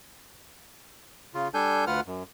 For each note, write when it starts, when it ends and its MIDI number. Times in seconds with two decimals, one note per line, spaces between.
1.34 1.48 49
1.34 1.48 65
1.54 1.85 55
1.54 1.85 62
1.54 1.85 69
1.54 1.85 80
1.54 1.85 91
1.87 2.00 38
1.87 2.00 65
1.87 2.00 71
1.87 2.00 78
1.87 2.00 89
2.06 2.23 42